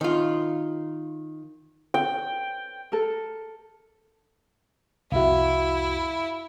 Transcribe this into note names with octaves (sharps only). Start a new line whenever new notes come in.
D#3 F4
G5
A4 A#4
C2 F2 E4 F#4 E5 F5